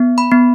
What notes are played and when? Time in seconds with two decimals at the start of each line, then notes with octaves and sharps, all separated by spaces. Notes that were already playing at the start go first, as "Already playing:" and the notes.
Already playing: B3
0.18 B5
0.32 B3